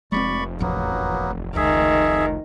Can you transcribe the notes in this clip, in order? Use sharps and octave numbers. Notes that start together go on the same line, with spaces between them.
F1 G#3 A3 C4 D5 B5 C#6
A1 E2 F3 F#3 A#3 B3
C#2 D#3 G#4 E5